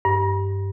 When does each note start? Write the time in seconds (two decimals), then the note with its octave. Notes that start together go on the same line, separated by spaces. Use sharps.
0.05 G2